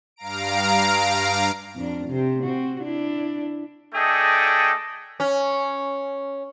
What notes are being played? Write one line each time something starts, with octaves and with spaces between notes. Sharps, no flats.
G2 F5 A#5 D7
F2 D4
C3 C4
C4 F#4
D4 E4
A3 D4 G#4 A4 D#5 G5
C#4